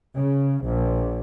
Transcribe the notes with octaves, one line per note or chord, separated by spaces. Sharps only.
C#3
A#1